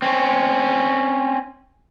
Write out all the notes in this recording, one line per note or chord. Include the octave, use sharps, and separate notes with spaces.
C4 C#4